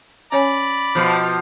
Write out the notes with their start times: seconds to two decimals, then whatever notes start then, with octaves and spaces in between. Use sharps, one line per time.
0.32 C#4 C#5 D5 G#5 B5
0.95 B2 F3